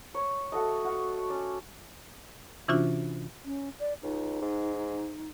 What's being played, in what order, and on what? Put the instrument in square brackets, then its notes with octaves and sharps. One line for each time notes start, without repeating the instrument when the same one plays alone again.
[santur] C#5
A3 F#4 A4 D#5
F#4 F5
C#4 D5
[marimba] C3 E3 C#4 D4 F4 F#4
[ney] C#4
D5
[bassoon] C#2 [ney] D#4
[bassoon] G#2